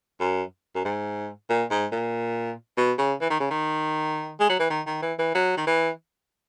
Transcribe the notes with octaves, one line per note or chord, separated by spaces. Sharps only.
F#2
F#2
G#2
A#2
G#2
A#2
B2
C#3
E3
D#3
C#3
D#3
G#3
F#3
E3
D#3
D#3
E3
E3
F#3
D#3
E3